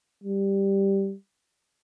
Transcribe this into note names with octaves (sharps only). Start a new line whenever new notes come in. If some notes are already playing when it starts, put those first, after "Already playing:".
G3